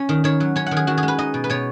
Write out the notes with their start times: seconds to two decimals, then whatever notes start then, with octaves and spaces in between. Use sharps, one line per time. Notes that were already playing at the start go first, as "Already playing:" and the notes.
Already playing: C#4
0.09 D#3
0.24 D#3 C#5
0.40 F#3
0.56 C#4 C#5
0.66 D#3 F#5
0.77 G#4
0.87 D#3 F#4
0.98 G#4
1.03 G#3
1.08 B4
1.18 D#4 D#5
1.34 B2
1.44 B4
1.50 B2 C#5